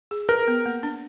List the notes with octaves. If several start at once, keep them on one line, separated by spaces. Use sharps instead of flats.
G#4
A#4 B4
B3
A#3
D4